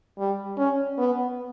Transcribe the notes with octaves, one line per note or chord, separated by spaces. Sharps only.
G3
C#4
B3